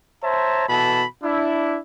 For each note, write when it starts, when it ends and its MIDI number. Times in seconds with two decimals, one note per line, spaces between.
0.23 0.65 72
0.23 0.65 73
0.23 0.65 76
0.23 0.65 81
0.23 0.65 82
0.69 1.04 47
0.69 1.04 52
0.69 1.04 69
0.69 1.04 81
0.69 1.04 83
1.23 1.78 62
1.23 1.78 64